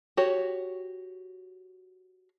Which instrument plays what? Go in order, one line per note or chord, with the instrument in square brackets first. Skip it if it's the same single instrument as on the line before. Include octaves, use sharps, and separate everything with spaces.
[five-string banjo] F#4 G4 C#5